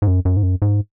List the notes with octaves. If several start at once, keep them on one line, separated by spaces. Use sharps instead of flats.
G#2
F#2
F#2
G#2
F#2
G#2